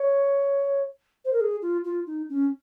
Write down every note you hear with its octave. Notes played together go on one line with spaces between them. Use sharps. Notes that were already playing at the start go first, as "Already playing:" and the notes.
Already playing: C#5
C5
A#4
G#4
F4
F4
D#4
C#4